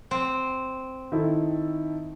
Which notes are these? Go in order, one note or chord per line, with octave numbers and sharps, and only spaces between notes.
C4
D#3 E4 A4